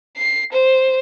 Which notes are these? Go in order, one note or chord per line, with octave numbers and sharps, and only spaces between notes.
C7
C5